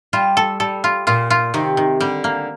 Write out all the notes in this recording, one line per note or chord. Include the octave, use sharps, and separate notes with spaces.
G3 F4
A4
G3 A4
F4
A#2 F4
F4
C3 D#3
D#3
D3 G3
A#3